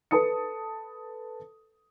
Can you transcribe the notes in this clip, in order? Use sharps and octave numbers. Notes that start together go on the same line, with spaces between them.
A4 B4 A5 D#6 C#7